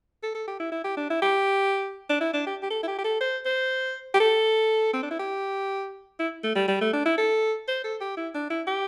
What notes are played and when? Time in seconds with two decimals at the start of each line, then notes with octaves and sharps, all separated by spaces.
0.23 A4
0.35 A4
0.47 G4
0.60 E4
0.72 E4
0.84 G4
0.97 D4
1.10 E4
1.22 G4
2.10 D4
2.21 E4
2.33 D4
2.47 G4
2.63 G4
2.70 A4
2.83 E4
2.87 G4
2.98 G4
3.04 A4
3.21 C5
3.45 C5
4.14 G4
4.20 A4
4.93 C4
5.03 D4
5.11 E4
5.19 G4
6.19 E4
6.44 A3
6.56 G3
6.68 G3
6.81 A3
6.93 D4
7.05 E4
7.18 A4
7.68 C5
7.84 A4
8.01 G4
8.17 E4
8.34 D4
8.50 E4
8.67 G4